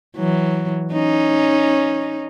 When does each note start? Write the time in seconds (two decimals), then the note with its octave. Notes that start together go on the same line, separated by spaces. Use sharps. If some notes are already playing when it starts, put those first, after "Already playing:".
0.17 E3 F#3
0.93 C#4 D#4